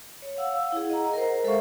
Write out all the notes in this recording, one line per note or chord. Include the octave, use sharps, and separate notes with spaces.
C#5
F5 F#5 E6
E4 G#4
D#5 F#5 A#5
A#4 C5
G#3 A4 C5 E5 F5 C#6